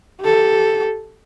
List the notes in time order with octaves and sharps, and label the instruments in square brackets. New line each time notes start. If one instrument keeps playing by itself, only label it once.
[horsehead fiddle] G4 A4